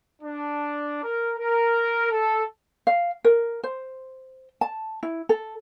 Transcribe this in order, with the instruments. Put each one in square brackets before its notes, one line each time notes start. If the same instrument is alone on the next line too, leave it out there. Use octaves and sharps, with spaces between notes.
[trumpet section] D4
A#4
A#4
A4
[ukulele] F5
A#4
C5
A5
E4
A4